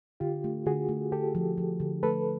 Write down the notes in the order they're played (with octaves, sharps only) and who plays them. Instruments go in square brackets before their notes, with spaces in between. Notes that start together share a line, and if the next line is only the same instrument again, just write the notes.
[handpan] D3 [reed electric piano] F4 G4
[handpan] A3
[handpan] D3 [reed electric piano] F#4 G#4
[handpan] A3
[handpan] D3 [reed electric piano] G4 A4
[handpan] F3
F3
D3
[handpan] A3 [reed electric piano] A4 B4